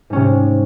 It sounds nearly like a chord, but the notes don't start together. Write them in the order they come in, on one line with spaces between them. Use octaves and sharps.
G#2 C#4 C3